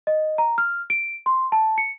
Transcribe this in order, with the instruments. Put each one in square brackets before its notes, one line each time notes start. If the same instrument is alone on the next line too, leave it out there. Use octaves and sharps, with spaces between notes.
[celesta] D#5
A#5
F6
D7
C6
A5
C#7